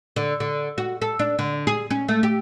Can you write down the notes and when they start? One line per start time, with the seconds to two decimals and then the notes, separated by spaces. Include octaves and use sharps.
0.16 D3
0.40 D3
0.78 F#4
1.01 A4
1.19 D4
1.39 D3
1.67 G#4
1.90 C#4
2.08 A3
2.23 G4